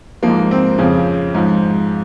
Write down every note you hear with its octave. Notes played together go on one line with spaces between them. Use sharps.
G#2 F3 A#3
C4
F2 C#3 F3
G#2 F3